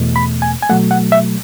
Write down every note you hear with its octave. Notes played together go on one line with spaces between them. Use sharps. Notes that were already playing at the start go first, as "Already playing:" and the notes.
Already playing: E2 B2 A3
B5
G#5
G#5
B2 F#3 A3 F#5
F#5
E5